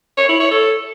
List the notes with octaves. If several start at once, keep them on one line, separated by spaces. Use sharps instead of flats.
C#5
E4
C#5
A4